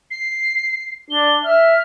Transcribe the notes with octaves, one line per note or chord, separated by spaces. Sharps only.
C7
D4 G7
E5 F6